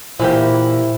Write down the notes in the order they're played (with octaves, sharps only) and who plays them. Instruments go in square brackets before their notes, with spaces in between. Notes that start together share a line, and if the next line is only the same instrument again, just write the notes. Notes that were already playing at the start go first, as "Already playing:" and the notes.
[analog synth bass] A#2 [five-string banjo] E3 A#3 G4 [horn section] E4 [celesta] C5